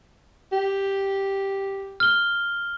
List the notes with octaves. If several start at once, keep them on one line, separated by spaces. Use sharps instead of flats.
G4
F6 G7